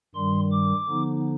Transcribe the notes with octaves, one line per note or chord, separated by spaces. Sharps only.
G2 D#3 G3 C6
D6
D3 F3 B3 D#4